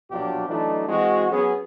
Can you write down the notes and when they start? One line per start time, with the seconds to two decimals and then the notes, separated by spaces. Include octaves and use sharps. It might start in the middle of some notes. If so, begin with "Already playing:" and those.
0.11 A#1 B2 F#3 D4 F4 G4
0.48 E3 F#3 A3 D4 D#4
0.88 E3 G#3 C4 F#4
1.32 F#3 B3 C#4 G#4